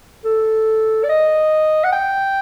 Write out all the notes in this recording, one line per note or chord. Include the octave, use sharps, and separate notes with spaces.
A4
D5
D#5
F#5
G5